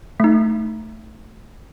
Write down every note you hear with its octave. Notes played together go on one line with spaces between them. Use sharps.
A3 D#4